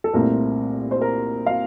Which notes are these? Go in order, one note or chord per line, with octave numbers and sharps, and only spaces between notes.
A4
C2 A#2 A3 C4 A#4
C5
A#4
F5